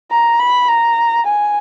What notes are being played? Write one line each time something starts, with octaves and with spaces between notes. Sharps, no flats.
A#5
B5
A#5
G#5